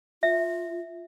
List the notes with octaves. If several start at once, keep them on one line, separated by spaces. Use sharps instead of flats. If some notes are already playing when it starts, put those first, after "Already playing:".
F4 E5